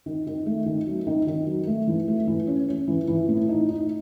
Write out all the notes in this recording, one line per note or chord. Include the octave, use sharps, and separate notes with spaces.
D#3
D#3
A3
D#3
F#3
D#3
D#3
F#3
A3
E3
A3
E3
C#4
C#4
E3
E3
A2
D#4
D#4